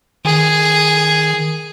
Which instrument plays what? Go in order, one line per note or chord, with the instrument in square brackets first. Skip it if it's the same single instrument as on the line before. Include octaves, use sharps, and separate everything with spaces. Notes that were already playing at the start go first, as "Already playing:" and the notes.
[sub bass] D#3 [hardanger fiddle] G#4